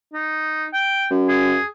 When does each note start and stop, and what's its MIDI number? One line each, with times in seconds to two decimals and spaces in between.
0.13 0.67 63
0.74 1.07 79
1.10 1.56 42
1.29 1.66 68